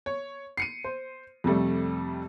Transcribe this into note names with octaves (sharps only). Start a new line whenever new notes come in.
C#5
C7 C#7 D#7
C5
F2 C3 G3 A3